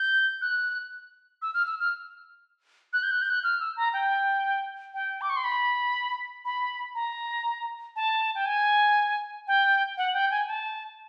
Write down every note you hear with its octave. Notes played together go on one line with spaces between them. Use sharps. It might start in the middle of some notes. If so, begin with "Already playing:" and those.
Already playing: G6
F#6
E6
F6
E6
F6
F#6
G6
F#6
G6
F#6
F6
E6
A#5
G5
G5
D6
C#6
C6
B5
B5
A#5
A5
G5
G#5
G5
F#5
G5
G#5
A5